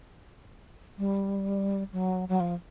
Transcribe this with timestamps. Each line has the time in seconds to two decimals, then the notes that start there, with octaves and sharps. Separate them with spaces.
0.98 G3
1.93 F#3
2.29 F#3
2.40 F3